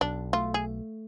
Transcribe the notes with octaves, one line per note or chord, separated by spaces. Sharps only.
B1 D4
A3 F4
G#4